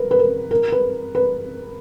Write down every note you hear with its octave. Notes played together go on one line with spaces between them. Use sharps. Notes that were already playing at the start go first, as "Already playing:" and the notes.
Already playing: A#4 B4
B4
A#4
A#4
B4
B4